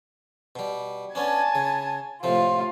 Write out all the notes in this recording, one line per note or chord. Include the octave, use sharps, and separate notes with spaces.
B2 G3
B3 C#4 D4 G#5 A5 G#6
C#3
A2 C3 F3 A3 F4